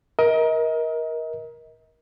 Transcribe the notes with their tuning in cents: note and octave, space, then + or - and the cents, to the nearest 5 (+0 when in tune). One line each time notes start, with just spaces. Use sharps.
A#4 +20 D#5 +35